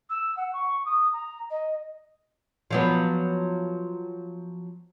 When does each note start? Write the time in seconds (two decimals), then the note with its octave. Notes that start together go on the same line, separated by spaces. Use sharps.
0.09 E6
0.36 F#5
0.53 C#6
0.85 D#6
1.12 A#5
1.50 D#5
2.71 F3 F#3 B3